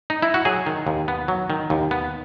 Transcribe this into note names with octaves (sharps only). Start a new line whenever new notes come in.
D#4
E4
F#4
F#3 G#4
D#3
D#2
B3
F#3
D#3
D#2
B3